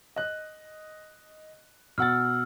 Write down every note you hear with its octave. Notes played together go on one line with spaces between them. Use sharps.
D#5 F#6
B2 F#5 E6 F6 A6